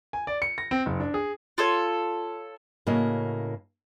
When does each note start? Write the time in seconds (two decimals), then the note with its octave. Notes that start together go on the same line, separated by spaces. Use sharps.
0.13 G#5
0.27 D5
0.42 C#7
0.58 A#6
0.71 C4
0.86 F#1
1.00 D4
1.14 G#4
1.58 F4 A4 C#5
2.86 A2 C#3 A#3 F#4 D#5